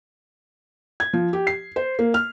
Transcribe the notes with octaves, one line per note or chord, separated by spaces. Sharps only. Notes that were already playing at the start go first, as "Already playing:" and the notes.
G#6
F3
G4
C7
C5
A#3
F6